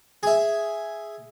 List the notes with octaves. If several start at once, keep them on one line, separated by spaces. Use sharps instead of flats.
G#4 E5